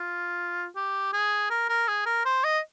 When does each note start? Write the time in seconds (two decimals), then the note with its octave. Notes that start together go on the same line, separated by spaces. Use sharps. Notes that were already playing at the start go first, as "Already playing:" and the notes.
Already playing: F4
0.76 G4
1.13 G#4
1.50 A#4
1.69 A#4
1.88 G#4
2.06 A#4
2.25 C5
2.44 D#5